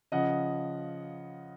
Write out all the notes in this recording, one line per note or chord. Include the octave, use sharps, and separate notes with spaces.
C#3 F3 D#5 F#5